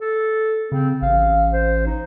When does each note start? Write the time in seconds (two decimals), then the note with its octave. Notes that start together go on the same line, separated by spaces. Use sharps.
0.01 A4
0.72 C#3 C4
1.02 A1 F5
1.53 C5
1.86 D#4